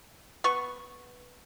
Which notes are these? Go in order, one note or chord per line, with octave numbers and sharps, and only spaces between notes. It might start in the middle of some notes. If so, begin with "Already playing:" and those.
B3 C#6